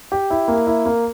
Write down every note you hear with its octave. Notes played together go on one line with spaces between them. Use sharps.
G4
E4
A#3
E4
A#3